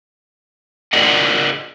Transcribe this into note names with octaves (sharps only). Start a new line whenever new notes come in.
F4 G#4 A#4 D5 D#5 F#5